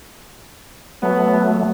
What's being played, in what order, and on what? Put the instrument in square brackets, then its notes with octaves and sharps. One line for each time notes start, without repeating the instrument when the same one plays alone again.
[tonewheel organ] F#3 A3 [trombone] B3